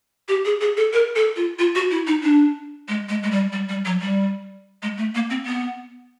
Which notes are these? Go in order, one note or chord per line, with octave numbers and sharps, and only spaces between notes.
G4
G#4
G#4
A4
A#4
A4
F4
F4
F#4
E4
D#4
D4
G#3
G#3
G#3
G3
G3
G3
F#3
G3
G#3
A3
A#3
C4
B3